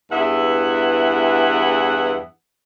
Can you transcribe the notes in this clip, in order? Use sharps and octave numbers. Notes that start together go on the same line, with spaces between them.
E2 G2 E3 G#4 E5 F#5